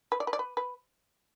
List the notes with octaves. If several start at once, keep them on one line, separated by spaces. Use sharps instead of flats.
B4
D5
B4
D5
B4
B4